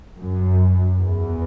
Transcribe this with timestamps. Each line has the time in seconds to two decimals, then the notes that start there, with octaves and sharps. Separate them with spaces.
0.19 F#2
1.01 E2